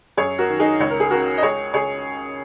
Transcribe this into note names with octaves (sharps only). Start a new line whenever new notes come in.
F#2 G#4 C#5
F#4 A#4
D#3
D#4 G#4
C#2 C#5
A#4
G#4
C#3 F#4 A#4
D#5
C#2 G#4 C#5
C#2 G#4 C#5